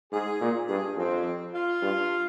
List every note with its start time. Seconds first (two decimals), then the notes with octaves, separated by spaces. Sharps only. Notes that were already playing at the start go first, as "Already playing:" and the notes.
0.12 G#2 G#4
0.41 A#2
0.68 G2 G#4
0.97 F2 C4
1.53 F4
1.82 G2